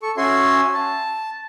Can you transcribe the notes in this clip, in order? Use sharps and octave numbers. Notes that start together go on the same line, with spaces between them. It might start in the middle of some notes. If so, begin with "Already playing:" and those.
A4 C#6
C#4 F#4 E5 G#5 C6
A5